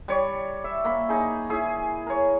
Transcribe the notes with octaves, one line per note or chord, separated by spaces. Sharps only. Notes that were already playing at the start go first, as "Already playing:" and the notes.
G3 C#5 D5
E5
A#3 B5
D#4 G#4
E4 G#4
A#4 C#5